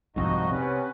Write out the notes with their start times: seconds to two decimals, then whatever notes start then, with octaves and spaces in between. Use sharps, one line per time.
0.16 C2 F2 G#2 D#4 F#4 D#5
0.51 C3 B3 C#4 B4